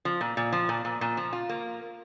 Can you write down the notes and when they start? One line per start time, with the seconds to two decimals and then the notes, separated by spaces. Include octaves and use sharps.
0.05 F3
0.21 A#2
0.37 A#2
0.52 F3
0.69 A#2
0.85 A#2
1.01 A#2
1.17 F3
1.33 F4
1.49 A#3